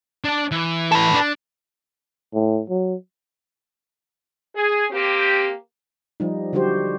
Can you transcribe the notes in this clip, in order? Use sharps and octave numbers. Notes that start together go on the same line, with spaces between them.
D4 A5
E3
A4 B4
D4
A2
F#3
G#4
A#3 C4 G4
F3 G3 D#4
D3 F#3 G3 F#4 G4 C5